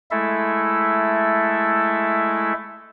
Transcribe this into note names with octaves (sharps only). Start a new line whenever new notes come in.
G#3 A3 E4 A4 E5